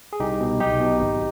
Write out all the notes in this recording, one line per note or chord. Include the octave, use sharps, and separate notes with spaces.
G#4
C2 D#4 G4
B2
B1 D#4 G4
B2
G#1